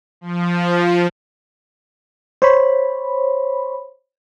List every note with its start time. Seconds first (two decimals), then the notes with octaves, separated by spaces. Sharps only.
0.21 F3
2.42 C5 C#5 B5